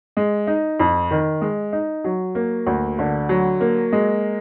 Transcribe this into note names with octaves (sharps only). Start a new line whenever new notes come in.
G#3
D#4
F2
D#3
G#3
D#4
F#3
A#3
D2
D3
F#3
A#3
G#3